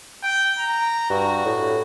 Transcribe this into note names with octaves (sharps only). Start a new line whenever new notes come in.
G5
A#5
G2 F#4
A2